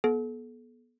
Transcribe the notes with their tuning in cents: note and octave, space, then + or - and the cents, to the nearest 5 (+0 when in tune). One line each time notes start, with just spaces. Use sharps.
B3 -30 A4 -40